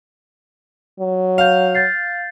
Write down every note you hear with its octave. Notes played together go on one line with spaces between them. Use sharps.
F#3
F5 G6 F7
G6 A6 C7